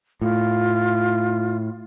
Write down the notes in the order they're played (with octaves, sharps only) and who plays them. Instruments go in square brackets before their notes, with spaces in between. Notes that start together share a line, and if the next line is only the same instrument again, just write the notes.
[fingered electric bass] A2 [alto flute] F4